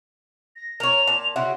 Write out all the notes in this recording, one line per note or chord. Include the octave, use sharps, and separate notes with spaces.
A#6
A#4 C#5 F7
A#2 A5
C#3 E4 F#4 C6